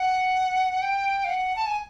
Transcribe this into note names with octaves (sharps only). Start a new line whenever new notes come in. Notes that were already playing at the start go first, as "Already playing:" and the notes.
Already playing: F#5
G5
F5
F#5
A5
G#5